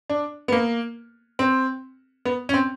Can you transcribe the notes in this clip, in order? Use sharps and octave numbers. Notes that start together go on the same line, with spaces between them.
D4
B3
A#3
C4
B3
C#4
C4